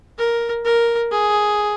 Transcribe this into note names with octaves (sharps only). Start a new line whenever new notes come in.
A#4
A#4
G#4